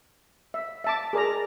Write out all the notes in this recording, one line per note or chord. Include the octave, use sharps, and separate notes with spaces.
E5
E5 A5 D6
G#4 A#4 D5 A#5